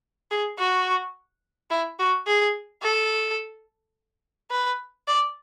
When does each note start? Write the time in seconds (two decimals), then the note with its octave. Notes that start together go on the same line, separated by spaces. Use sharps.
0.31 G#4
0.59 F#4
1.71 E4
1.99 F#4
2.27 G#4
2.83 A4
4.51 B4
5.08 D5